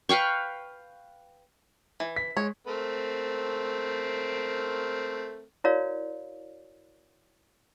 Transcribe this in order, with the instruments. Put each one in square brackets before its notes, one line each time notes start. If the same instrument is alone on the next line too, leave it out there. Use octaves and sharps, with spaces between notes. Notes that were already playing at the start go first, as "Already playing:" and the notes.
[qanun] B4 F5 G5 C#6
[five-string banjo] E3
[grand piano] B6
[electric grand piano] G#3 [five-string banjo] C#5
[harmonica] A3 C4 A#4
[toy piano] E4 F#4 A#4 C#5 D5 F5